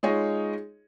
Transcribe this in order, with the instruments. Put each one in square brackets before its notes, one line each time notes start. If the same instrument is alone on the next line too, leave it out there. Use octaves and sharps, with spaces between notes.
[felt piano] G#3 D#4 F4 G#4 C#5 D#5